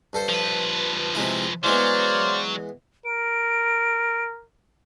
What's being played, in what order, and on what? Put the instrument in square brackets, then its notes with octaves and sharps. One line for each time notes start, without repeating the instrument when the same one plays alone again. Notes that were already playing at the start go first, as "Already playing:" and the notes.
[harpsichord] G2 A4 C5
[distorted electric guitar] F3 B4
[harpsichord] C3 G#3 E4
[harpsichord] E3 G#3 B3 [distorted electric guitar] F#3 [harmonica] C5 D5 F5
[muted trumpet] A#4 [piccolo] D7